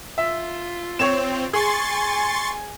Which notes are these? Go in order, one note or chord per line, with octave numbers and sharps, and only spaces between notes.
F4 E5
C4 C#5 E7
G#4 G#5 C6 C#6 A6